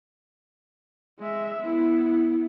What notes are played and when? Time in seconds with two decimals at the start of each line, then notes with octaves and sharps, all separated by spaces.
1.19 G#3 E5
1.61 B3 E4